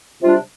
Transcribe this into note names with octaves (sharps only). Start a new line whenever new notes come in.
C3 G3 D4 F4